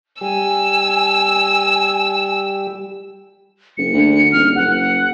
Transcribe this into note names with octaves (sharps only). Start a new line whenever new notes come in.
G3 G4 G#5 E6
F#1 C#7
D2
D#1 F6
F#1 F#5